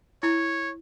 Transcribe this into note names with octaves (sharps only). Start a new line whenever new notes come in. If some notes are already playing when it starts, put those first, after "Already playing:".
E4 C#5